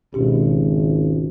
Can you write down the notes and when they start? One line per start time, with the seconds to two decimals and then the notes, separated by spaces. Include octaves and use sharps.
0.14 G#1 C#2 B2 C#4 G4